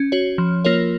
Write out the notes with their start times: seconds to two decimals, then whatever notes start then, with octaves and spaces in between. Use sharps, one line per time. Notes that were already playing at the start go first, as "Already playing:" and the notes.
Already playing: C#4
0.12 F#4 C#5
0.38 F3
0.65 A#3 F4 A#4 C#5